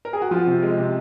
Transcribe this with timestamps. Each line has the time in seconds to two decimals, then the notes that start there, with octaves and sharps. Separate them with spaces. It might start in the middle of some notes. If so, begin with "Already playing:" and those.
0.05 A#4
0.13 G#4
0.22 F#4
0.31 F3 F4
0.47 C3
0.62 G#3
0.78 C3